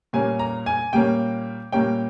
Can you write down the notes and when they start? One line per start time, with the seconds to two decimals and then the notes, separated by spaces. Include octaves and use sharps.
0.13 A#2 G3 A#3 C#4 G#5
0.39 A#5
0.66 G#5
0.93 A#2 G3 A#3 C#4 G5
1.72 A#2 G3 A#3 C#4 G5